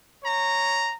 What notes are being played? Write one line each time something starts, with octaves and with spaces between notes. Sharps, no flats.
C#5 A#5